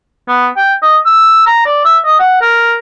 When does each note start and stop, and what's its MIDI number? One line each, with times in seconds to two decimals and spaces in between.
0.28 0.47 59
0.56 0.74 79
0.82 0.97 75
1.06 1.42 88
1.47 1.63 82
1.66 1.80 74
1.85 1.98 76
2.05 2.19 75
2.19 2.41 78
2.41 2.75 70